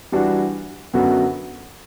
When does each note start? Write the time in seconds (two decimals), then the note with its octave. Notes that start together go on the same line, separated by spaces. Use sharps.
0.12 E3 G3 D4 F#4
0.93 F#2 D3 F#3 B3 F#4